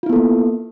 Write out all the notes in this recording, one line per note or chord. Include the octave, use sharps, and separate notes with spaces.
A#3 B3 E4 F4 A4